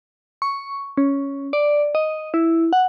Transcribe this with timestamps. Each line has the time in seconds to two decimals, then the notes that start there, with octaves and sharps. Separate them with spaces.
0.42 C#6
0.97 C#4
1.53 D5
1.95 D#5
2.34 E4
2.73 F#5